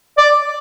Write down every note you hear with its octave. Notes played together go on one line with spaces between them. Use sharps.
D5